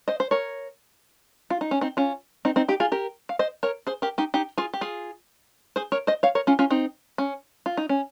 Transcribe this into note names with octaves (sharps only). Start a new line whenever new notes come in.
C5 D#5
C5
A#4 C#5
F4
D#4
C#4
C4 D#4
C#4 F4
C4 D#4
C4 D#4
D#4 G4
F4 G#4
G4 A#4
F5
C5 D#5
A#4 C#5
G#4 C5
G4 A#4
D#4 G4
D#4 G4
F4 G#4
G4
F4 G#4
G#4 C5
A#4 C#5
C5 D#5
C#5 F5
A#4 C#5
C#4 F4
C#4 F4
C4 D#4
C#4
F4
D#4
C#4